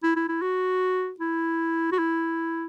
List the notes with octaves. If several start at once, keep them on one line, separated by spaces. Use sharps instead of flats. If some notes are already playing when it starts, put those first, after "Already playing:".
E4
E4
E4
F#4
E4
F#4
E4